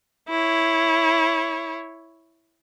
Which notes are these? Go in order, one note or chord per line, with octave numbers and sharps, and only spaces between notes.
E4 C#5